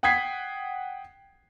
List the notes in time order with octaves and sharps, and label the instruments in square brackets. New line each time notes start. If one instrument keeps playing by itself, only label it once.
[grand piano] F#5 G5 D#6 G#6 B6 C7